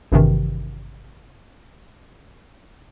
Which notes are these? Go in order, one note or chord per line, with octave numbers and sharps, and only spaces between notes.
G#1 G2 C3 D#3 E3